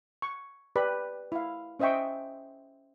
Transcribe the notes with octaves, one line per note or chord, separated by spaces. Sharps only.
C#6
G4 B4 D5 B5
E4 F5
C#4 C5 D#5 E5 G5 C#6